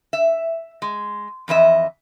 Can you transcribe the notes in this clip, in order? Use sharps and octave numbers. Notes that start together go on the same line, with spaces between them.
E5
G#3
F2 E3 D#5 E5